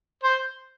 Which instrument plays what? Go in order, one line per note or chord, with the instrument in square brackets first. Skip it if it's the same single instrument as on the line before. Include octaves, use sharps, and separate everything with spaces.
[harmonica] C5